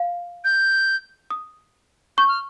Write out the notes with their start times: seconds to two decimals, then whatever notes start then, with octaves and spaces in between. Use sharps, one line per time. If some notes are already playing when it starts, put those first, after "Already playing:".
Already playing: F5
0.45 G6
1.30 D#6
2.18 C#6 G6
2.29 F6